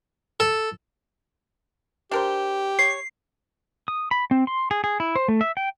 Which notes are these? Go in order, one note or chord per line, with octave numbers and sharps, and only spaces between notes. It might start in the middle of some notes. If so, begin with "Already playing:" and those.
A4
D4 G4 A#4 C5
C#5 C7
D#6
B5
C4
C6
G#4
G#4
E4
C5
A3
E5
G5